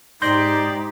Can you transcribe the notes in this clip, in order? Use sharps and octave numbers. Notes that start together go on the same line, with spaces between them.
G#2 D#4 G4 C5 D5 C6 G6 A#6